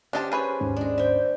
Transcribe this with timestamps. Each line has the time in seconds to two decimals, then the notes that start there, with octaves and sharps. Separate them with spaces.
0.13 C#4 D4 G4 C5 D#5 A5
0.32 G#4 B4 C#5
0.60 D#2 G#2 C#4
0.76 G#3 D4
0.98 C5 E5 G5